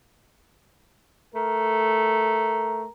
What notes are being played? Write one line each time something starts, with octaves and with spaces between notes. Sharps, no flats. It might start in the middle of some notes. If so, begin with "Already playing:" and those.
A3 A#4